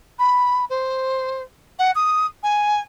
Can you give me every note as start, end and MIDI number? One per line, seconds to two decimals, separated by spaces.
0.19 0.65 83
0.69 1.42 72
1.79 1.91 78
1.95 2.26 87
2.43 2.81 80